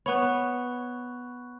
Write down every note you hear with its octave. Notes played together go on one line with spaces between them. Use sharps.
B3 C#5 B5 C#6 F#6